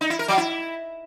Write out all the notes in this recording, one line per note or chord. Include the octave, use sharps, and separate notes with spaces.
D#4
E4
A#4
F#3
E4